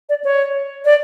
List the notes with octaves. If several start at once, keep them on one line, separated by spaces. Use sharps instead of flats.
D5
C#5
D5